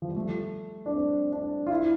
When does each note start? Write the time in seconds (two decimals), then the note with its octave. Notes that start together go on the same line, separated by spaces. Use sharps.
0.02 F3
0.09 G3
0.16 A3
0.86 D4
0.94 C4
1.32 D4
1.67 F4
1.71 E4